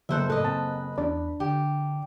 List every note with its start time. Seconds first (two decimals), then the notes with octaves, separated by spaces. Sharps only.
0.09 F#1 A#3 A4 C5 E5 F#6
0.30 A2 A4 B4 D#5
0.44 C4 A5
0.98 E2 D4 D5
1.40 D3 G4